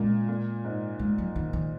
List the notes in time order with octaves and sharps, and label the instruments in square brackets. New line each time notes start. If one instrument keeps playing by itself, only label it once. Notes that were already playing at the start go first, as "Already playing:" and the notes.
Already playing: [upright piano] A#2 C#3 [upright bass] G#3
[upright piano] A#2
G#2
[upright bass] G#3
F#3
D#3
D#3